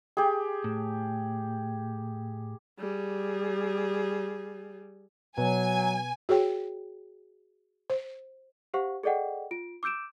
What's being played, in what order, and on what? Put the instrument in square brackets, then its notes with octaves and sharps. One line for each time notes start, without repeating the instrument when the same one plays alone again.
[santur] G4 G#4
[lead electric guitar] A2
[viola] G3 G#4
[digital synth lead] B2 [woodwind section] F#3 [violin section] G#5
[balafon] F#4 G#4 C#5 G5
C5
[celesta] G4 C5 F5 F#5 C#6
G#4 A4 D5 D#5 F#5 G5
F4 D7
D6 E6 G6 D7 E7